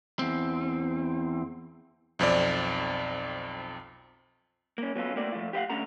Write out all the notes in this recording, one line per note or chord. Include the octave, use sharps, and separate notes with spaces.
E2 C4
B1 F2 C4 D5
A#3 C#4
F#3 B3 C#4 F4 A4
A3 A#3 C4 F#4 D5
F3 A3 F4
G4 B4 D#5 F5 F#5
D3 A3 C#4 A4 F#5 A#5